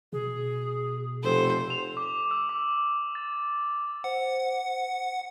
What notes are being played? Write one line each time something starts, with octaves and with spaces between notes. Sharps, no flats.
B2 G#4
F1 A4 C5
F7
D6
E6
D6
A6
C5 F#5